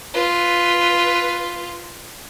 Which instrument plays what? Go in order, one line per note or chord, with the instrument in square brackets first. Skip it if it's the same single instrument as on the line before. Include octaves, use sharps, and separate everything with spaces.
[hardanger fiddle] F4 B4